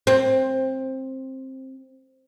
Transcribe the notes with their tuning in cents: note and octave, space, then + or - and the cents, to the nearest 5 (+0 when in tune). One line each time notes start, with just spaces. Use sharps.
C4 +15